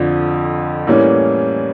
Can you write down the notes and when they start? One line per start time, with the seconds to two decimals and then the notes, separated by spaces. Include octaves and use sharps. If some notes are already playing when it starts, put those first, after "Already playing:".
Already playing: F2 D3 F3
0.87 A2 E3 G3 A#3 C#4